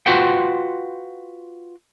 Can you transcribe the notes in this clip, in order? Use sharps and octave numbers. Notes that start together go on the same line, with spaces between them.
F4 F#4 B4 C5 F#5 G5